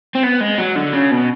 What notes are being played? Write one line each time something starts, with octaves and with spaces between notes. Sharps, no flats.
C4
B3
G#3
F#3
D3
C#3
B2